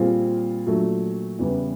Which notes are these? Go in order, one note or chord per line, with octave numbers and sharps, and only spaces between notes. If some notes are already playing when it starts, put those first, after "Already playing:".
Already playing: A#2 G3 C4 F4 G#4
A#2 F#3 A3 D4
E2 C#3 E3 G3 B3